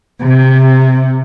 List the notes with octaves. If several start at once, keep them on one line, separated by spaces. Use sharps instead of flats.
C3